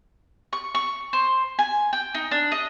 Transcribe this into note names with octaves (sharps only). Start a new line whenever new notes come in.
C#6
C#6
C5
G#5
G5
D#4
D4
D#5